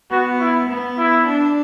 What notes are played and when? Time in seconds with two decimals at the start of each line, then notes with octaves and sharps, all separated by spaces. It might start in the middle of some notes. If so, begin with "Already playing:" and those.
0.11 B3 F#4
0.40 E4
0.69 B3
0.98 E4
1.27 D4